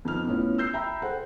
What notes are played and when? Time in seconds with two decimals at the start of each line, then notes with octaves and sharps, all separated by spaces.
0.05 F2 B3 D#4 F6
0.27 A2 B3 C#4 F4
0.58 E6 G6 C7
0.74 E5 G5 A#5 B5
1.02 G#4 A4 C5 F#5 G5